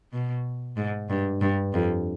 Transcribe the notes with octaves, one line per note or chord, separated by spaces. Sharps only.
B2
G#2
G2
G2
F2